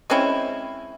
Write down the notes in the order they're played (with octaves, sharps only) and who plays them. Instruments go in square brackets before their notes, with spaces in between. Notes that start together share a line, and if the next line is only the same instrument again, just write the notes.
[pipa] G#3 C4 C#4 E4